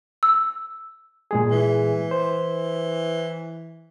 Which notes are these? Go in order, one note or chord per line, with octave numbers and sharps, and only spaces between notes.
E6
A#2 G#3 G#4
E3
C5